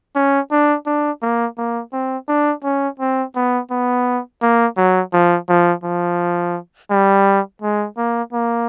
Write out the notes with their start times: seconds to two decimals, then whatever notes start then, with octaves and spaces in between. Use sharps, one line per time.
0.15 C#4
0.51 D4
0.86 D4
1.22 A#3
1.57 A#3
1.93 C4
2.28 D4
2.64 C#4
2.99 C4
3.35 B3
3.71 B3
4.42 A#3
4.77 F#3
5.13 F3
5.49 F3
5.84 F3
6.91 G3
7.62 G#3
7.97 A#3
8.33 A#3